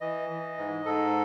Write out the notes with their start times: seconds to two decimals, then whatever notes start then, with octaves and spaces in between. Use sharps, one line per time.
0.01 E3 D#5
0.30 E3
0.58 G#2
0.86 G#2 A4